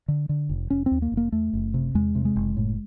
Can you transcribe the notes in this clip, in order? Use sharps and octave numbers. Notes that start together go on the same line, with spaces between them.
D3
D3
F1
F1 C#4
C4
D#2
A#3
F1
A#3
E2 A3
F#1
C3
E2 G#3
C3
G#3
F#1
A2